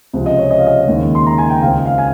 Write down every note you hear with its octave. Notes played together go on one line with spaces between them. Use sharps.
C#2 C3 F3
D#5
C#5
D#5
F5
D#5
D#2 C#3 G#3
C6
A#5
G#5
G5
C#2 C#3 G#3 C4 F5
F5
G#5